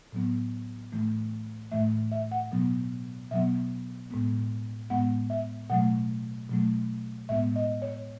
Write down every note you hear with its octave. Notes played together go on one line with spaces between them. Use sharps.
A2 F#3 B3
A2 E3 A3
A2 E3 A3 E5
E5
F#5
B2 F#3 B3
B2 F#3 B3 E5
A2 G#3 B3
A2 G#3 B3 F#5
E5
B2 F#3 A3 F#5
B2 F#3 A3
A2 G#3 B3 E5
D#5
C#5